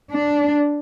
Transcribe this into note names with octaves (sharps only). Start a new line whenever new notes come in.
D4